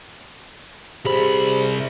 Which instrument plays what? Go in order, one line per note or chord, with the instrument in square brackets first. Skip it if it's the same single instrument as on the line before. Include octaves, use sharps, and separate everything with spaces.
[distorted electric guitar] C2 B5 [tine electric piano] G4 G#4 C5